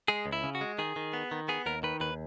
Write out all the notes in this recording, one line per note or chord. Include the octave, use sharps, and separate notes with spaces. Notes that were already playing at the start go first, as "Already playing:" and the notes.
G#3 G#4
C#2
E4
C#3
F#4
G#3
D#3 G#4
D#3
B3
D#3
B3 G#4
D#2 A#4
D#3 B4
D#2 B4